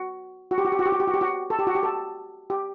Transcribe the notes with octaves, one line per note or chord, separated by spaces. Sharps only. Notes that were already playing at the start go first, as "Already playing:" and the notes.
Already playing: F#4
F#4
G4
F#4
G4
F#4
G4
F#4
G4
F#4
G4
F#4
A4
G4
F#4
G4
A4
G4